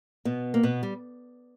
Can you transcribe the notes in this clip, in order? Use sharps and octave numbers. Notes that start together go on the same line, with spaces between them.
B2 B3
A#3
B2 B3
G3